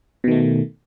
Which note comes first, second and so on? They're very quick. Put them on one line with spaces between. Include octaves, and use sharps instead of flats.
B2 D#3 A3